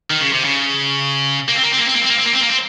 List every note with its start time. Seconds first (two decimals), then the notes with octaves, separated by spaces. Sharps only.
0.11 D#3
0.21 C#3
0.33 C3
0.45 C#3
1.49 A#3
1.55 C4
1.63 A#3
1.72 C4
1.79 A#3
1.86 C4
1.95 A#3
2.02 C4
2.10 A#3
2.18 C4
2.26 A#3
2.33 C4
2.41 A#3
2.49 C4